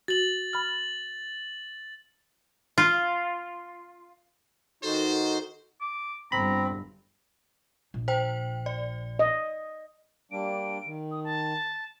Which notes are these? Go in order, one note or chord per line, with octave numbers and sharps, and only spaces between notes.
F#4 A6 F#7
B5 F6
F4
D#3 D#4 F#4 A4 C5
D6
G1 C4 A#5 B5
A#1
C5 G5
D5
D#5
G3 A#3 D4 D7
D#3
D#6
A5